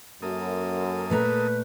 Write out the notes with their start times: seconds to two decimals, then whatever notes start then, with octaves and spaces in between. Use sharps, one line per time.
0.22 F#2 A#3 A4 D#6
1.10 A#2 A3 B4 A#5